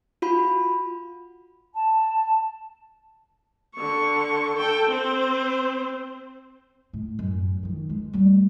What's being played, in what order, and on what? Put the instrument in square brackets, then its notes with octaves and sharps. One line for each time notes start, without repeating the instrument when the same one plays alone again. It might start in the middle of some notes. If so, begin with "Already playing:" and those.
[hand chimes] F4 F#4 B5
[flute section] A5
[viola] D3 C#6
A4 G5
C4 C5
[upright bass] A2
F#2
D#3 F3
G#3
G3 A3